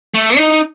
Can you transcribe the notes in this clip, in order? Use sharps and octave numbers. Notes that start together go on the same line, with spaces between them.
A3
D#4